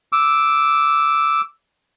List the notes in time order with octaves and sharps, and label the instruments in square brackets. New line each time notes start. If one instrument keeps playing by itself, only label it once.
[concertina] D6 E6